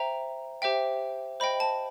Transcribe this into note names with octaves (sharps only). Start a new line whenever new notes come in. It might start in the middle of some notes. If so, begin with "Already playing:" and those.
Already playing: C5 E5 G5 A#5
G4 C5 E5 G5
C5 D#5 G5 B5
A5